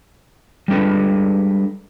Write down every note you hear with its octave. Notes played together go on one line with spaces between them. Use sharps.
G3 G#3 D4 A4 B4